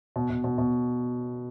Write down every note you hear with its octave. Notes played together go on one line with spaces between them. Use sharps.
B2
B2
B2
B2